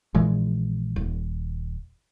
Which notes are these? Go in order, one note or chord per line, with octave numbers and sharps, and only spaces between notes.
A#1 A#2 E3 G#3
D#1